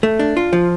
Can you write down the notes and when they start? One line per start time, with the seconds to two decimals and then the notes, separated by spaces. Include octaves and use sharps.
0.03 A3
0.19 D4
0.37 F4
0.53 F3